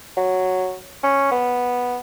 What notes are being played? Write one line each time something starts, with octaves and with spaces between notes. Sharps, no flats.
F#3
C#4
B3